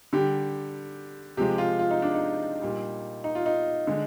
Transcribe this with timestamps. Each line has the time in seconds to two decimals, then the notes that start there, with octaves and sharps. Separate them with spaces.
0.13 D3 G3 G4
1.37 C3 F3 G#3 G4
1.58 F4
1.79 F4
1.91 D#4
2.02 D4
2.14 D#4
2.62 A#2 G3
3.24 D#4
3.35 F4
3.46 D#4
3.87 D3 G#3